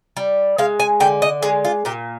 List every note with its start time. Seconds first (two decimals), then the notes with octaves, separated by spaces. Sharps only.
0.17 G3
0.58 G#3 F5
0.80 G#5
1.00 D3 G5
1.22 D#5
1.43 G#3 G#4
1.65 F4
1.85 A#2 G4